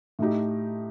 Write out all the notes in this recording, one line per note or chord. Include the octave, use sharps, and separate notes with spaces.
A2 A3 D#4 G4